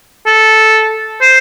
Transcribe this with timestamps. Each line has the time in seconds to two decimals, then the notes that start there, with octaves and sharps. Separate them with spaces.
0.26 A4
1.21 C5